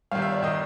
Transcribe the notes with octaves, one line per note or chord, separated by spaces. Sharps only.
G1 G2 D#3 F5
E5
D5
D#3 D#5